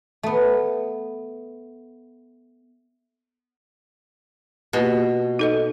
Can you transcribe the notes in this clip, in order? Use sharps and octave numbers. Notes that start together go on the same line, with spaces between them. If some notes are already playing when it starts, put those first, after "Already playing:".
A3 B3
B2 A#3 F4 G4
D#4 A4 D#5